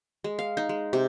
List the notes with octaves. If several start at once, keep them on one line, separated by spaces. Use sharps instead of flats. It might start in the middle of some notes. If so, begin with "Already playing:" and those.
G#3
F5
D#4
G#3
C3